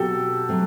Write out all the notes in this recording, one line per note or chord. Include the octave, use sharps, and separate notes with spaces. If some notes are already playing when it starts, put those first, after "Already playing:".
Already playing: B2 F#3 C4 F#4 G4 A4
F#3 A3 C4